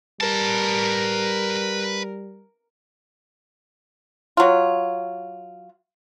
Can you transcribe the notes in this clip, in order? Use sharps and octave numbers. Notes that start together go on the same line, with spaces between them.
G3 A#4 B4 A5
F#3 F4